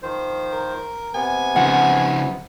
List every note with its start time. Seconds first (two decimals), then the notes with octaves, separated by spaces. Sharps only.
0.03 D#3 F3 C5
0.53 A#4
1.14 C3 B3 G#5
1.56 C#3 F3 F#5